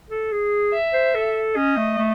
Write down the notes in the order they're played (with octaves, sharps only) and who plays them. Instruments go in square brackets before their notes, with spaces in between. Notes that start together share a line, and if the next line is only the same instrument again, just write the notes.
[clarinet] A4
G#4
[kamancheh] E5
[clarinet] C5
A4
[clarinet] C#4 [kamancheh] D#5
[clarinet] A3
A3